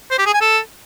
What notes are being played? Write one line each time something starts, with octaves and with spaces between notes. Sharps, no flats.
C5
G4
G#4
G#5
A4